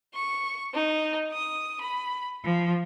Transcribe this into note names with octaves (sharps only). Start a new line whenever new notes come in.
C#6
D#4
D#6
B5
F3